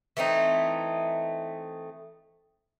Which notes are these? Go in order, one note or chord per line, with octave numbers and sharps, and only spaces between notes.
E3 A3 C4 D#4